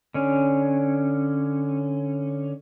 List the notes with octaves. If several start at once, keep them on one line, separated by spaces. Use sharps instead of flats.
D3 C#4